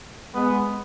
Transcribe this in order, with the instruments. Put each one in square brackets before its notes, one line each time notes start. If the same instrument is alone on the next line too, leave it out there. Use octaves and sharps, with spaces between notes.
[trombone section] G#3 B3